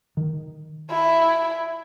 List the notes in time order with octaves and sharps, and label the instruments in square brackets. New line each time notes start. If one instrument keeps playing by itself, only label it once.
[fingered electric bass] D#3
[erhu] E4